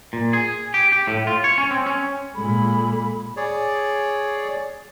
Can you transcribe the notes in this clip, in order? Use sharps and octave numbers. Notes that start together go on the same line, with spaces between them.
A#2
G#4
G4
G4
A2
F4
C#5
C#4
C4
C#4
A#2 G#3 A4 B5
G#4 C#5 D5